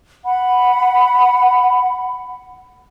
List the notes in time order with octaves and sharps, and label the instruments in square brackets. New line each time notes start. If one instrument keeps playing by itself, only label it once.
[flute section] F#5 B5